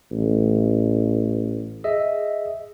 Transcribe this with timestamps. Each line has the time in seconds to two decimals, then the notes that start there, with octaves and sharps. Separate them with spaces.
0.12 A1
1.84 G#4 D#5 E5